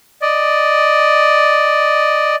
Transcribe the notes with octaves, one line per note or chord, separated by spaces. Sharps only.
D5 D#5